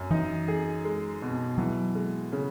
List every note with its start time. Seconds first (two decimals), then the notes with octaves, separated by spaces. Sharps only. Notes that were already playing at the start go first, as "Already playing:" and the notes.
Already playing: F#2
0.11 E3 D#4
0.48 G#4
0.84 G#3
1.22 B2
1.58 E3 F#3
1.95 G#3
2.32 C#3